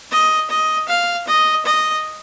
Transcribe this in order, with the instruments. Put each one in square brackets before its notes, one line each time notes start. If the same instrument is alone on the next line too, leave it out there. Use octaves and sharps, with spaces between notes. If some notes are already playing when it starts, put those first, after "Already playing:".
[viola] D#5
D#5
F5
D#5
D#5